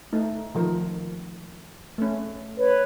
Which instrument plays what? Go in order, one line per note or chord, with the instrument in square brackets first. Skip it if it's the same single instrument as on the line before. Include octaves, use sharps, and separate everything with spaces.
[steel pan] A3 D#4
D#3 F3 A#4
A3 C#4
[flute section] B4 C#5